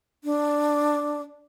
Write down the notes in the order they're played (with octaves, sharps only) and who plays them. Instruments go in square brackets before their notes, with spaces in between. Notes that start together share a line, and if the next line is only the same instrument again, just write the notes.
[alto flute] D4